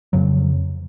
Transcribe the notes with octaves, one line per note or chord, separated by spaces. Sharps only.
F2 C#3 F#3